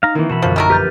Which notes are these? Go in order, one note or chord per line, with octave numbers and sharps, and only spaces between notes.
D#4 F5 A#5
D#3 E3 A#3 C4 E4
B2 E3 F#4 A5 B5
A#1 F#2 D3 F3
D#3 A3 A#4
G4 B4 F6 G6 A6